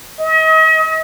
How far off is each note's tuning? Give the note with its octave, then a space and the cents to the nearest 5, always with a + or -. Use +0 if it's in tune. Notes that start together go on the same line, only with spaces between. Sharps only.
D#5 +40